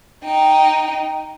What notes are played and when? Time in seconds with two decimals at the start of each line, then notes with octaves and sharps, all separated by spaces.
0.25 D#4 G5